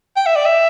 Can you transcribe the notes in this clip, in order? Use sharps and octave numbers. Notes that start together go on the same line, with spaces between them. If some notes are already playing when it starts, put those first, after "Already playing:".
G5
E5
D5
E5